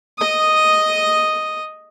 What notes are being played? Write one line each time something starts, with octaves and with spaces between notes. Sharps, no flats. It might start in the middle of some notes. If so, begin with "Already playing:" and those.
D#5 D#6